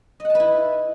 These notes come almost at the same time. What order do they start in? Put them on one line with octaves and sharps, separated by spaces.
D#5 F#5 A5 B4 E4